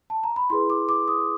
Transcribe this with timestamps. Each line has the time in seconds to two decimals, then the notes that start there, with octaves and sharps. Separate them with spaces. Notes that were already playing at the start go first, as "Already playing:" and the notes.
0.10 A5
0.24 A#5
0.36 B5
0.50 E4 G#4 B4 C6
0.70 D6
0.89 D6
1.08 D#6